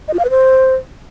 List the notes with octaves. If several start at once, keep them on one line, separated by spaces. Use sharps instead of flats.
D#5
F4
F5
B4
C5